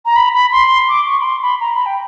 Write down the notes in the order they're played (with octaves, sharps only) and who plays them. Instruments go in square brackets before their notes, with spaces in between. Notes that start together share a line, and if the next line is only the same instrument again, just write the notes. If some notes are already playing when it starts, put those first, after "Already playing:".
[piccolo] A#5
B5
B5
C6
D6
C#6
B5
C6
B5
A#5
B5
G5